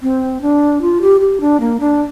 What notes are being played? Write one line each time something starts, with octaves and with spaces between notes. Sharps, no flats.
C4
D4
F4
G4
G4
D4
A#3
D4